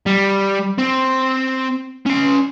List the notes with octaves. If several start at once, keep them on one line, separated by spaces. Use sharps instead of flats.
G3
C4
C#4 C6